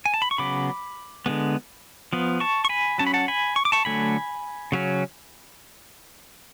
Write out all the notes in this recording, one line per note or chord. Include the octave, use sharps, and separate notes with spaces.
G#5
A5
B5
C#6
C#3 F#3 B3 B5 D6
D3 G#3 B3
F3 B3
A5 C#6
C#6
G#5 B5
F#3 C#4 A5
B5
F#5 A5
G#5 B5
C#6
D6
A5 C#6
D3 F#3 A3 G#5 B5
C#3 F#3 C#4